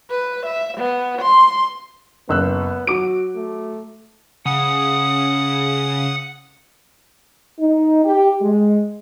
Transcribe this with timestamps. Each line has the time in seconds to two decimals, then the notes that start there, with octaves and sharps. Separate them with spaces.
0.10 B4
0.46 E5
0.77 B3
1.21 C6
2.29 F#1 B3 E6 F#6
2.87 F#3 F#4 D6 D7
3.35 A3
4.45 C#3 F#5 D#6
7.59 D#4
8.05 G4
8.42 G#3